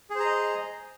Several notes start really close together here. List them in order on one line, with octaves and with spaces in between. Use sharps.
G#4 C5 A#5 D#5